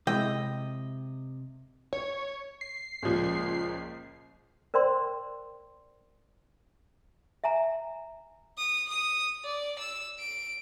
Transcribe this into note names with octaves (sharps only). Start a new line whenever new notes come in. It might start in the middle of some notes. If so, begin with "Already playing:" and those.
C3 G#3 E4 D#5 G5
C#5
C7
C#2 A#2 F3
A#4 C5 D5 G5 C6
E5 G#5 A#5
D#6
D#6
D5
E6
D7